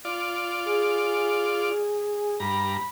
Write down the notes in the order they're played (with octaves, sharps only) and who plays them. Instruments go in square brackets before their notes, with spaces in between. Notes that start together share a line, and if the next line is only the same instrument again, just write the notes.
[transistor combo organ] F4 D5
[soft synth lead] G#4
[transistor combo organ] G2 A#5 [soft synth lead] B5